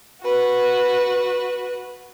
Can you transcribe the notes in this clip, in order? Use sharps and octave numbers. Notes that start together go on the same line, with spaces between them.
F#4 B4